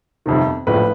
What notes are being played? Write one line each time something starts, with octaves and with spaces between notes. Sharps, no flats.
G1 F2 C3 D#3
A#1 A2 F3 B4